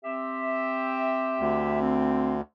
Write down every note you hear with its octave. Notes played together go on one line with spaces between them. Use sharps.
C4 G4 E5
D2
C4